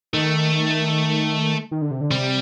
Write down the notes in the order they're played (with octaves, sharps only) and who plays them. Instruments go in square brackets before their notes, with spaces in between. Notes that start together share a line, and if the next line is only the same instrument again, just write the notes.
[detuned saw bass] D#3 [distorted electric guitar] A3
[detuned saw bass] D#3
D3
C3
D3
[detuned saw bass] C3 [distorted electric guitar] G3